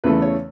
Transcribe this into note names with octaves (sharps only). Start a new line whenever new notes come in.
E2 C#3 E3 A3 B4
C#5